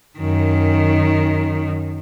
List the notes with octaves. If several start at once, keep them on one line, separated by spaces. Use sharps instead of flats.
F#2 D#3